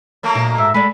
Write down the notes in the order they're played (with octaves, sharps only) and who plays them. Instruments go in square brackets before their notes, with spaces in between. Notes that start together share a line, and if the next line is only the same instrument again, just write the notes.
[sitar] F#3 A3 A#3
[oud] A#2 D#4
[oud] G#2 [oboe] E5
[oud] G#3 A4 D5 [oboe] B5